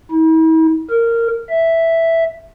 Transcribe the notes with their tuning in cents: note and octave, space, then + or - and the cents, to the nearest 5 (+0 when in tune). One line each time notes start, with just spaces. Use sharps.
E4 -45
A#4 -15
E5 +0